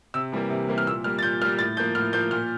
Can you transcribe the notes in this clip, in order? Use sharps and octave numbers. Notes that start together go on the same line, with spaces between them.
C3 E6
E3 G3 A#3
C3
E3 G3 A#3
F6
A#2 E6
G3 A#3 F6
A6
A#2 G6
G3 A#3 F6
A2 A6
F3 A#3 G6
A2 F6
F3 A#3 G6
A#2 F6